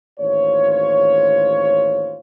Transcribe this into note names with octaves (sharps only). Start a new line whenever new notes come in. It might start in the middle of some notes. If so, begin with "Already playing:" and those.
A1 D#2 F4 C5 C#5